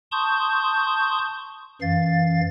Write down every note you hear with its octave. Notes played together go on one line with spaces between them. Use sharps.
A5 C6 C#6 D#6 G6
F#2 E3 F5 A6